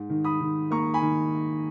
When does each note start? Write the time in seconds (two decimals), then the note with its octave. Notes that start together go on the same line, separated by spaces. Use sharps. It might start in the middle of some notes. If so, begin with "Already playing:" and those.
Already playing: G#2
0.10 D#3
0.24 B5 D#6
0.40 D#3
0.71 A#3 A#5 C#6
0.94 G#5 B5
1.02 D#3